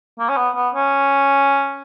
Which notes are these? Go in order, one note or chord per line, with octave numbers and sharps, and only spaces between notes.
A#3
C#4
B3
B3
C#4